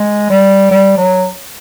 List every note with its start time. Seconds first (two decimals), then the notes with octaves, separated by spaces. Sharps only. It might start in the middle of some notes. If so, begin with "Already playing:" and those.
Already playing: G#3
0.30 G3
0.71 G3
0.97 F#3